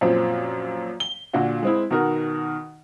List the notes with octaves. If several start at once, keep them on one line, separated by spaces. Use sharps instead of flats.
F#2 A#2 F3 C4
G7
A#2 D3 D4 F#4
G#3 C4 E4
B2 D#3 F#4 A#4